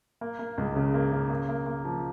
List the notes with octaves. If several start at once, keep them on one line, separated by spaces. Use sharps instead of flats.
A#3
A#3
C#2
C#3
A#3
C#3
A#3
A#3
A#3
F3